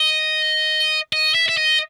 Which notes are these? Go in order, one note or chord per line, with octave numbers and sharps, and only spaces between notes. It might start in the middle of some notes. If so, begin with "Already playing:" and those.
Already playing: D#5
D#5
E5
E5
D#5